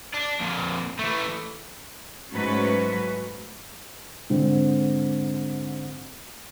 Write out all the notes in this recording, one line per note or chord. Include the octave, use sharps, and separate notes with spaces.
D4
F2 A#2
E3 A3
G#2 F#3 A3 C#4 F#4 B4
G#2 D3 C4